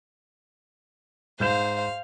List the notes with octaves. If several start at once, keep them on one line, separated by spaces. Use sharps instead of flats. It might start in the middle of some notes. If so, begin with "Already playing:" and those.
G#2 C5 F5 G6 E7